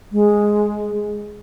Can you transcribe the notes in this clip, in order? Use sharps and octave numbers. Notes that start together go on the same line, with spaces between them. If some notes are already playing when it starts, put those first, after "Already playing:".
G#3